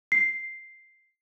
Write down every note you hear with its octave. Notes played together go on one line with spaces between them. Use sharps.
C7